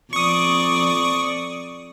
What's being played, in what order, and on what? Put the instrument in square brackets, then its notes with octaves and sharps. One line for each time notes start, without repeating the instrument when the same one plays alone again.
[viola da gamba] F2 D5 [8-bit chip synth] C#6 D#6